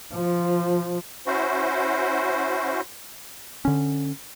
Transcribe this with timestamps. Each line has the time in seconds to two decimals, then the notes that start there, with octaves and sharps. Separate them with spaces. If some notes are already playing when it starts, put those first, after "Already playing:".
0.13 F3
1.26 C#4 E4 F#4 C5
3.65 D3 C#4